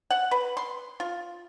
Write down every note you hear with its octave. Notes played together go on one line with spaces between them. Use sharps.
F#5
B4
C6
F4